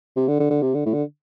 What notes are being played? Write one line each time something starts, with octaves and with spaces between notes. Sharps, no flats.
C3
D3
D3
D3
C3
D3
A2
D3